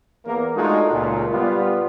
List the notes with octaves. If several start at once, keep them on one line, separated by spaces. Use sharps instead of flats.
E2 A#3 A#4
G#3 A3 D4 D#4 F4 F#4
C#2 A#2
G3 B3 F4